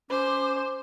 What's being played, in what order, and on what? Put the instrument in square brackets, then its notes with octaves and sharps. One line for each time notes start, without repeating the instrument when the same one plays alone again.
[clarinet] C#4 [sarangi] C5 [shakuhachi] D6